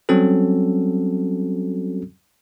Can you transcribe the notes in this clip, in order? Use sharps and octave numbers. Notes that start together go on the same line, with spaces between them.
F#3 G3 C4 C#4 F#4 A4